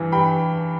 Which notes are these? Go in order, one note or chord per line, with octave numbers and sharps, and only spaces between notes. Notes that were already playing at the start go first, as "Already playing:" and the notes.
Already playing: G2 E3
G2 G5 B5